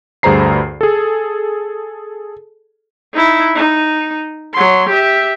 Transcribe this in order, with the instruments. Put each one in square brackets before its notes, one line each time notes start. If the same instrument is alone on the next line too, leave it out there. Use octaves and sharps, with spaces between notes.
[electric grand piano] D2 G2 G#4 C5 A#5 C7
G#4 A4
[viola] D#4 E4
D#4
F#3 C6
G4 E5